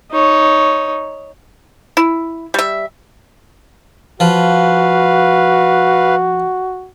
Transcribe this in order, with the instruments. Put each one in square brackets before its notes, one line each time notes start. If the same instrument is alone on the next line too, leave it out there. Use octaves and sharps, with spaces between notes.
[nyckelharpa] D#4 C#5
[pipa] E4
G3 E5
[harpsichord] F3 [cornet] F#4 [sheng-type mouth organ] B4 F5